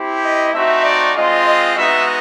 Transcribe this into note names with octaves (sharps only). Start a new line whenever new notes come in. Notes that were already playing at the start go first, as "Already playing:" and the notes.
Already playing: C4 E4 G4
D#5
A3 C4 D#4 F#4 E5
D5
G#3 C4 F4 D#5
D#5
G#3 B3 D#4 F#4 E5